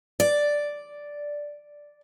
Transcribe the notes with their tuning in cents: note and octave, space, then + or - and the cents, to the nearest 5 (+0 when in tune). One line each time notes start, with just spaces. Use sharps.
D5 +0